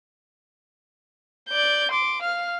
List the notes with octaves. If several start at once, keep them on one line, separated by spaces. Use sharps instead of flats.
D5 G6
C6 D6
F5 F6